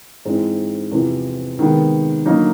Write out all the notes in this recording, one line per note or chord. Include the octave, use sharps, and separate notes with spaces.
G#2 E3 G#3 C4
E2 C3 F3
C3 D#3 G#3 B3
D3 F#3 A#3 D#4